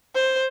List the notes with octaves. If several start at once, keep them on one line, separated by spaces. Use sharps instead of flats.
C5